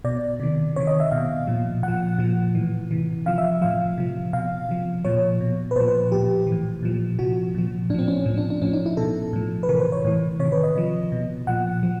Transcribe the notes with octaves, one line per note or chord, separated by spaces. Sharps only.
B2 D5
C3 D#3
C3 D#3 C#5
D#5
E5
B2 F5
A#2 F3
A#2 F3 F#5
A#2 F3
A2 E3
C3 E3
C3 F3 F5
E5
A2 F3 F5
C3 F3
B2 F5
C3 F3
A#2 F3 C#5
B2
B4
A#2 F3 C5
B4
A#2 F3 G4
E3
A2
A#2 F3
C3 F3 F#4
A#2 F3
A2 F3 C4 D4
C#4
A2 F3
D4
D4
A2 F3 C#4
D#4
E4
B2 A4
A2 F3
B4
C3 E3 A#4
C5
C#5
A2 E3
C3 D#3 C#5
B4
D#5
C3 F3
B2
A#2 F3 F#5
F3